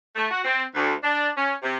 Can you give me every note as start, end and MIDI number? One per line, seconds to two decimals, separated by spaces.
0.16 0.25 57
0.31 0.43 66
0.44 0.63 60
0.75 0.93 38
1.03 1.30 62
1.37 1.53 61
1.62 1.77 48